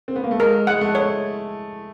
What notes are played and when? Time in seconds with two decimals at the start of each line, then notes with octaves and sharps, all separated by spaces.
0.08 C4
0.16 B3
0.24 A#3
0.31 A3
0.40 G#3 A#4
0.67 G#3 F#5
0.81 A3
0.95 C#5